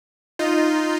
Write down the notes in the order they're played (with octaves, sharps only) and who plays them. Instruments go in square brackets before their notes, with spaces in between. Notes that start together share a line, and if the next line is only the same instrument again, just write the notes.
[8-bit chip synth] D#4 F4